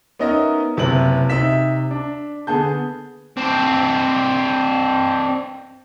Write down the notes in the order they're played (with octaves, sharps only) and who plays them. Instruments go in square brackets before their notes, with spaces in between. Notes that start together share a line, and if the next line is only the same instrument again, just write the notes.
[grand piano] B3 C#4 D#4 A#4 D#5 E5
F#1 C3 E4 B4 F#7
C3 D#4 E5 B6 E7
D4
D3 B3 G#4 A5 G6
[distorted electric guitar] C4 D4